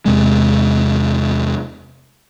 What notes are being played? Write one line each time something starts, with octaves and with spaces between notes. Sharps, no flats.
E2 C3 G#3